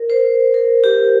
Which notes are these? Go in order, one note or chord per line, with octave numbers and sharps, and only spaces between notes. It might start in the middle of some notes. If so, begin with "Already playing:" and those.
Already playing: A#4
C5
A#4
G4